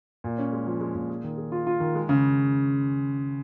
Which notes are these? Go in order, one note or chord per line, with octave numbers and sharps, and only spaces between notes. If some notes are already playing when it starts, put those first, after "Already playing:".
A#2
C#4
G#3
F3
G#3
A#2
G#4
D#3
G#4
F4
F4
D#3
G#3
C#3